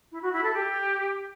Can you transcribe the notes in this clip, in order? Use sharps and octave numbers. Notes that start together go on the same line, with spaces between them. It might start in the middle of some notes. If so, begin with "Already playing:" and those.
E4
F#4
E4
A4
G4